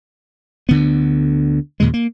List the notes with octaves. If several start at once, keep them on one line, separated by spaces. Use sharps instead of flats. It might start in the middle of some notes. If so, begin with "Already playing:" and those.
D2 D3 B3
D#2 A#2 C#3 G#3
A#3